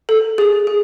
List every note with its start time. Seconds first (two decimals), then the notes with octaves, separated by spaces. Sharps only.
0.09 A4
0.38 G#4
0.67 G#4